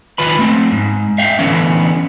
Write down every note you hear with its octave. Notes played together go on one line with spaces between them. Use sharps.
D#3 F4 B4 B5
A3 C4
G#2
E5 F5 G5
D3 E3 B3 C#4